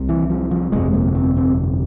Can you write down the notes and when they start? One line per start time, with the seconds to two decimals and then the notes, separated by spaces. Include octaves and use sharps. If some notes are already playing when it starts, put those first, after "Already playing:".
Already playing: C2 C3
0.09 E3
0.30 F3
0.51 F3
0.72 G1 F2 C3 G#3
0.94 A#3
1.15 C4
1.37 C4